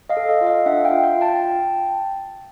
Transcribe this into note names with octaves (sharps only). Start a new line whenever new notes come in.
D#5 F5
A4
D#5 F5
F4
D#5 F5
D4 E5 F#5
F5 G5
F4
F5 G5
F4
G5 A5